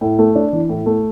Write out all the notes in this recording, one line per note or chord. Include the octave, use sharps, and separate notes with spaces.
A2
A3
D4
E3
A2
A3